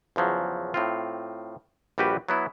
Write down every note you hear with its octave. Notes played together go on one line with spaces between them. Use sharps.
E2 C#3 F3 F#3
A2 C4 F4
A#1 G3 F#4 G4 B4
F#3 B3 E4